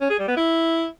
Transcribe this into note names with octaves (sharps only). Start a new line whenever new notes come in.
C#4
G#4
G3
B3
E4